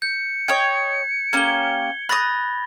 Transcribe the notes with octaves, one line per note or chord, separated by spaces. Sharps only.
G6 C#7
C#5 D#5 G5 G#6
A#3 C#4 G4 G#6 G7
B5 D#6 F#6 A6 A#6